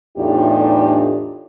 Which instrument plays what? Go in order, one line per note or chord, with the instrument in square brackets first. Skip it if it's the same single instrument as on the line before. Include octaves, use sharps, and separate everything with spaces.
[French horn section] E2 A2 D4 D#4 F4 G4